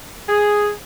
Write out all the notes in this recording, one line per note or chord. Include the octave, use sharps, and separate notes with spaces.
G#4